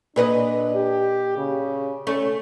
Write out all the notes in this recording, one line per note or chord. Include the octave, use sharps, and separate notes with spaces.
A#2 D4 B4 D#5
G4
C#3
A3 C#4